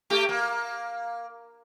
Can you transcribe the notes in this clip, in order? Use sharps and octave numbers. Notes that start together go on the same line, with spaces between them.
A3 G4
A#3